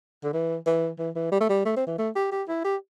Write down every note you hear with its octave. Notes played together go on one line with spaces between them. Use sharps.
D3
E3
E3
E3
E3
G3
A3
G3
A3
C4
E3
A3
G4
G4
E4
G4